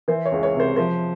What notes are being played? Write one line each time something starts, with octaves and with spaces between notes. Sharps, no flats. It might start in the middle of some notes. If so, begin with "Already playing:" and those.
E3 C5
C#5
C#2
C#5
C3
C5
F3 C5